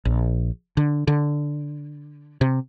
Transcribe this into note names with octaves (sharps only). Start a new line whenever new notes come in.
A#1
D3
D3
C3